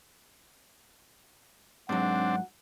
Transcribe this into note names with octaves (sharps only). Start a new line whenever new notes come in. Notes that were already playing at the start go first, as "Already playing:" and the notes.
G#2 F#3 C4 D4 F#5